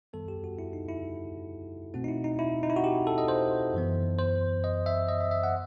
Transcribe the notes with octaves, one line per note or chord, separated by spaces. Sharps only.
F#2 D#3 G3 B3 A4
G4
F#4
E4
D#4
E4
B2 A3 C4 F#4
D#4
E4
D#4
E4
D#4
E4
F#4
G4
A4
D#5
C5
F#2 E3 B3
C5
D#5
E5
D#5
E5
E5
F#5